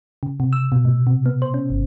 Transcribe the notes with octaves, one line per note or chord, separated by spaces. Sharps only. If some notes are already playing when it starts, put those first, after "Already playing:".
C#3
C3
E6
B2
A2
C3
B3
C5
C#4
G1